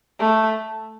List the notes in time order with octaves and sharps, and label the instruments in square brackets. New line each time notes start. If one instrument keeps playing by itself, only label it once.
[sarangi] A3